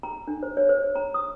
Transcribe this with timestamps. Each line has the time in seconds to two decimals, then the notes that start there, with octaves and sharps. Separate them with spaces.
0.03 A#5
0.27 D4
0.43 C5
0.57 C#5
0.69 C5
0.96 A#5
1.14 D#6